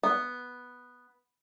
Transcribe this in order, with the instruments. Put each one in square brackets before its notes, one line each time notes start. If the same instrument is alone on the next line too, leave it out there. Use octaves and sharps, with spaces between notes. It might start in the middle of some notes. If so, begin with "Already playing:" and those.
[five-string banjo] B3